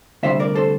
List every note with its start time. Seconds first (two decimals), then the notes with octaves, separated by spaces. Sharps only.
0.23 D2 C3 G3 D4 C5 E5
0.40 A#4 D5
0.55 A4 C5